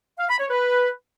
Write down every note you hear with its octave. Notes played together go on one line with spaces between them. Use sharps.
F5
B5
C#5
B4